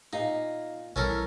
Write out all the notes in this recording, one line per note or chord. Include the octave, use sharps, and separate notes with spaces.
A#2 D#4 F5
B1 E3 G3 C#4 A4 A#4